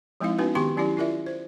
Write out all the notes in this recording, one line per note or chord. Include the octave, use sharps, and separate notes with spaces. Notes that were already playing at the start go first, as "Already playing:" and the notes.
F3 G#3 C4 D#4 E4 F5
B3 C#4 D#4 F#4 B4
D#3 B3 G4 A5 C6
F#3 C#4 E4 G4 D5
E4 F4 A#4 D5 E5
C5